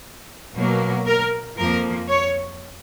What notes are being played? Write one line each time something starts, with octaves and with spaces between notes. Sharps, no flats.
B2 F#3 A#3
A#4
F2 F3 A#3 A#4
C#5